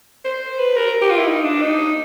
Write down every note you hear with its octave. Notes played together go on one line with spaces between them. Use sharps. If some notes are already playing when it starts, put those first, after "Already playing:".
C5
B4
A#4
G4
F4
E4
D#4
D4
D#4